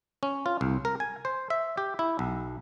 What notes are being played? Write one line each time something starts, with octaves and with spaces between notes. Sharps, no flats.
C#4
F4
C2
A#4
G#5
C5
E5
G4
E4
B1